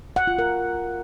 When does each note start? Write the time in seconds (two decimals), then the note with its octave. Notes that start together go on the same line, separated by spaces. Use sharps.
0.16 F#5
0.27 F4
0.39 A#4